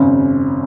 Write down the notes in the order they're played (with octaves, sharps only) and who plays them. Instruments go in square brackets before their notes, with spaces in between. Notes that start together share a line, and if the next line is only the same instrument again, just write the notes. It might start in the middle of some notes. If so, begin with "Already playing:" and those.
Already playing: [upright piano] G#1 F#2 C#3